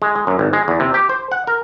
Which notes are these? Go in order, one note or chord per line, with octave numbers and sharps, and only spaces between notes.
G#3
G#3
F#2
G#1
G#3
E2
C3
G4
C5
F#5
A#4